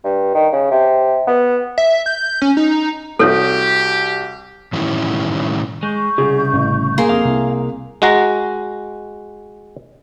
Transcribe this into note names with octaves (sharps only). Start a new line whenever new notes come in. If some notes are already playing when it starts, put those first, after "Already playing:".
G2
D#3
C#3
C3
B3
E5
G6
C#4
D#4
C2 F#4 G4 A4 C#5 E5
A2 D#3 E3 G3 C#4 E4
G#3 C#6 G6
C2 C#3 G#4 F#5
A1
A#3 G#4 C6
F2 F5 A#5 D#6
C2
G#3 F#4 A#5